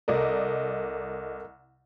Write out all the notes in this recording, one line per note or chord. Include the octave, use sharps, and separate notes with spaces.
C2 A4 A#4 D5 D#5